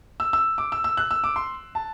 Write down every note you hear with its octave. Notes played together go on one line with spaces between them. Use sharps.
E6
E6
D6
E6
E6
F#6
E6
D6
C6
A5